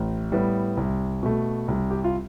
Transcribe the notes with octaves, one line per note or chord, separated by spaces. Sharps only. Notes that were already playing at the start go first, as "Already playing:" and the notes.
Already playing: A1
A2 G3 B3
C2
B2 A3
C2
G4
F4